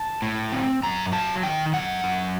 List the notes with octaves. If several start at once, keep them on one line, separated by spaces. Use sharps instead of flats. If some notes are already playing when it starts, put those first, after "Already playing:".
Already playing: A5
A2
C4
F#2 A#5
F#3 A5
D#3 G5
F#2 F#5
F#2